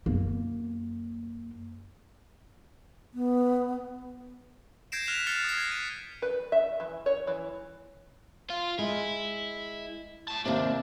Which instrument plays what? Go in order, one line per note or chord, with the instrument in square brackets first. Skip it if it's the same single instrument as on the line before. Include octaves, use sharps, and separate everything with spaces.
[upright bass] F#2 A#3
[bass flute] B3
[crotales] G6 G#6 A#6 C7 D7 E7
F6 F#6 B6 E7 F7
F6 A6 C7 C#7 E7
D#6 A#6 C7
G#6
D#7
[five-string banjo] B4
E5
E3
C#5
E3
[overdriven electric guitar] F4
[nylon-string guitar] G#3 [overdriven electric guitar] E4
[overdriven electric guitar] A2 A5
[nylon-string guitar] D#2 C3 [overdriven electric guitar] D4